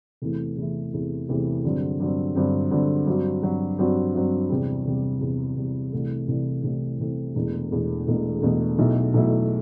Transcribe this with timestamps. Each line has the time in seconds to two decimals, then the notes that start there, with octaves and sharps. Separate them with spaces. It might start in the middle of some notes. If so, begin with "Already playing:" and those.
0.22 E2 C3 E3 A3 E4
0.58 E2 C3 E3 A3 E4
0.93 E2 C3 E3 A3 E4
1.29 E2 C3 E3 A3 E4
1.64 G2 D3 F#3 C4
2.00 G2 D3 F#3 C4
2.35 G2 D3 F#3 C4
2.71 G2 D3 F#3 C4
3.06 G2 F#3 C4 F#4
3.43 G2 F#3 C4 F#4
3.78 G2 F#3 C4 F#4
4.14 G2 F#3 C4 F#4
4.50 E2 C3 G3
4.85 E2 C3 G3
5.21 E2 C3 G3
5.57 E2 C3 G3
5.92 C2 C3 E3 A3
6.28 C2 C3 E3 A3
6.64 C2 C3 E3 A3
6.99 C2 C3 E3 A3
7.35 E1 E2 B2 A3
7.71 E1 E2 B2 A3
8.07 E1 E2 B2 A3
8.42 E1 E2 B2 A3
8.78 B1 B2 F#3 A3 E4
9.14 B1 B2 F#3 A3 E4